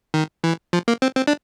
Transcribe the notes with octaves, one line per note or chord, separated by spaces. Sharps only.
D#3
E3
F3
A#3
C4
C4
D4